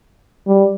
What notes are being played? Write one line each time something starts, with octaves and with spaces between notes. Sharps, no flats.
G3